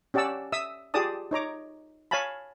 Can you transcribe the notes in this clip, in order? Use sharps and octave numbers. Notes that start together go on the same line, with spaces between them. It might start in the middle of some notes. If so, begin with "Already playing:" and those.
C#4 G4 D5 F#5 A5 E6
E5 D#6 E6
F4 G4 G#4 D5 A5 D#6
D#4 C#5 A#5 D6
C#5 F5 G#5 A5 B5